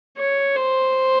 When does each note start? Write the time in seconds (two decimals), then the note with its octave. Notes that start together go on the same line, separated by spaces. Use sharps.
0.18 C#5
0.55 C5